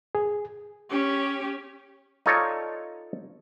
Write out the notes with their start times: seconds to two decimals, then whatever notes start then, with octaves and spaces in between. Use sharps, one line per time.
0.15 G#4
0.90 C#4 G4
2.26 D#4 F4 A4 C#5 D5